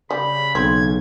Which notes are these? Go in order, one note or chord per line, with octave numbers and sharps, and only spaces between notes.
C#3 G3 B5
B1 C4 G#6